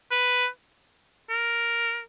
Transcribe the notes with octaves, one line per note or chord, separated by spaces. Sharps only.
B4
A#4